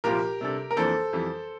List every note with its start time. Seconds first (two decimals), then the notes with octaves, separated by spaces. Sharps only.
0.04 C2 A#2 F3 A#3 F4 G4 A#4
0.41 C3 G3 D4 A4
0.71 A#4
0.76 F2 E3 A#3 D4 A4 C5
1.13 F2 E3 G3